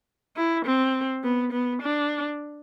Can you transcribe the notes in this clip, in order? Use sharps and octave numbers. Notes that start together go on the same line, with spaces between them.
E4
C4
B3
B3
D4